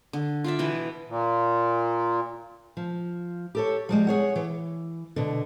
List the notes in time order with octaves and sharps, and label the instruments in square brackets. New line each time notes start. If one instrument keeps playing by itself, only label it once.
[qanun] D3
F4 D5 E5
B2 E3 B3
[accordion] A#2
[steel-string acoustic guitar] F3
G4 A4 C#5
F3 G3 G#3
G#4 C#5 F#5
E3
B2 D3